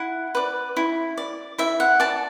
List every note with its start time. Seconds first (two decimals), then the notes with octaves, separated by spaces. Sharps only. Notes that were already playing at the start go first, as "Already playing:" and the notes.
Already playing: E4 F#5
0.35 B4 D5
0.77 E4
1.18 D5
1.58 E4 E5
1.80 F#5
2.00 D5 A5